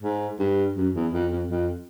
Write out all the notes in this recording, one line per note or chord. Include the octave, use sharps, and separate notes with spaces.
G#2
G2
F#2
E2
F2
F2
F2